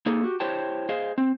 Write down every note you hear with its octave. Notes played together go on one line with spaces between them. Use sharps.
A#3 D#4 G#4 A4
F#4 G4
E4 G4 C5 C#5 G5 A5
G#4 C5 D#5 F5
C4